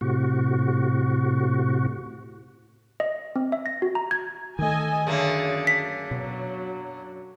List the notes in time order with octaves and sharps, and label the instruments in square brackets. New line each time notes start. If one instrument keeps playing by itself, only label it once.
[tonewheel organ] A2 C3 F#4
[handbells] D#5
C4
E5
A#6
F#4
A#5
G#6
[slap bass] D#3 A3 [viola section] A4 D#5 G#5
[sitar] F#2 D3 A#3 [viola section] G#4
[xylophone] B6
[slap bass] B2 [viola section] F#3